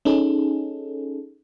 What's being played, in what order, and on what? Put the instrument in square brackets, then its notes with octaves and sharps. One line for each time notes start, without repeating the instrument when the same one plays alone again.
[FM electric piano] C#4 D#4 G#4 A4